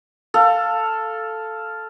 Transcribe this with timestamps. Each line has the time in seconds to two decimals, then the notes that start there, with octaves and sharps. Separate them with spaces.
0.34 A4 F5